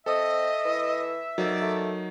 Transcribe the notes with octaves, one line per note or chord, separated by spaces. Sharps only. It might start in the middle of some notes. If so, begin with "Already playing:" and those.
C4 A4 D#5 E5
E3
F2 F#3 D#4 A#4 D5
A3